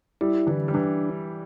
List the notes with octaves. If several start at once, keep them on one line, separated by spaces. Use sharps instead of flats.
G3 E4
D3 E3
G3
E3 D4